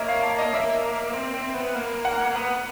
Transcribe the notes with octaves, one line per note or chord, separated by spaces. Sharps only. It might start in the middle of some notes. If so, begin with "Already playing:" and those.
Already playing: A#3 C#5 D#5 E5
F5
A5
D#5
A#3 E5
C4
C4
B3
A#3
F#5
B3